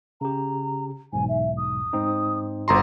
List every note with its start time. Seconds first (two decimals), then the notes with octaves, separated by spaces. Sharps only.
0.21 C#3 G4 A#5
1.13 B1 E2 G#2 G#5
1.29 E5
1.57 D#6
1.93 G#2 C4 D#4
2.68 G1 F#4 A4 C5 A#5 C6